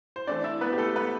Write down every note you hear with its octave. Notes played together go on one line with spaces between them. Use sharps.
C5
E3 A3 C4 D4 D5
E4 E5
B3 B4
G4
A3 A4
B3 B4